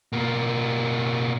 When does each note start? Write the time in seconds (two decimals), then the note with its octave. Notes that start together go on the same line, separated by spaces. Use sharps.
0.12 B2 A#3